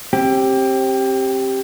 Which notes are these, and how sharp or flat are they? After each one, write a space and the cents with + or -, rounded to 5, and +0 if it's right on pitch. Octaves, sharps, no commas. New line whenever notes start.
C4 +30 G4 +0